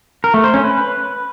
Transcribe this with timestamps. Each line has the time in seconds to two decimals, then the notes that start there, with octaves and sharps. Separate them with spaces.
0.24 A#4
0.34 A3
0.44 C5
0.54 C#4
0.64 B4